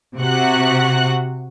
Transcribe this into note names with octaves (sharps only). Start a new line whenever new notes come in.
C3 F#4 F#5 F#6